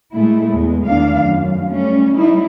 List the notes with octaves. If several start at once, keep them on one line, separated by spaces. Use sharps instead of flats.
A#2 G#3 A3 E4
E2 G#3
E2 D#3 A3 D4 F5
F#2
G3 A3 C#4
F#3 G3 D#4 E4